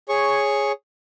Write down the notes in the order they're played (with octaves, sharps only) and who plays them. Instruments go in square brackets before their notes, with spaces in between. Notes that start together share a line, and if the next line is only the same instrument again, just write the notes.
[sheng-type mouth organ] G#4 C#5 C#6